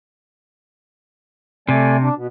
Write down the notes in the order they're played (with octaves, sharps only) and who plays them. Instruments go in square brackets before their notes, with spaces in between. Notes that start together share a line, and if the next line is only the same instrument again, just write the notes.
[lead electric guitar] C3 [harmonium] A3 D5 G#5
[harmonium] D4
B2